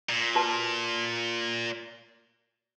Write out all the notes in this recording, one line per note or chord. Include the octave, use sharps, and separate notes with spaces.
A#2
F#4 B4 A5